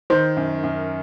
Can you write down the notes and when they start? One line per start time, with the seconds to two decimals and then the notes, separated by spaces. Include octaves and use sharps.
0.10 D#3 C5
0.37 F#2
0.64 F#2